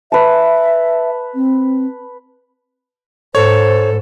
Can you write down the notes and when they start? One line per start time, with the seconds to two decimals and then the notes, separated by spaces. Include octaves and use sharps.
0.12 B4 E5 A5
1.35 C4
3.35 G#2 A4 C5 C#5